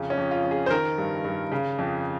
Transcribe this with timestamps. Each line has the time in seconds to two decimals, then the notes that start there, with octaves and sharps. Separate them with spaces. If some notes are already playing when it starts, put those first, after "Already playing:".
Already playing: F2 C#3
0.10 C#4
0.17 F2
0.31 F4
0.44 F2
0.51 G#4
0.66 C5
0.70 D#3 A#4
0.98 G2
1.24 G2
1.52 C#3
1.78 F2